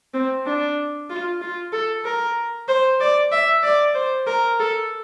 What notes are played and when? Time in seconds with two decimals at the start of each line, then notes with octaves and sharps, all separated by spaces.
0.14 C4
0.46 D4
1.10 F4
1.41 F4
1.72 A4
2.04 A#4
2.68 C5
3.00 D5
3.32 E5
3.63 D5
3.95 C5
4.26 A#4
4.59 A4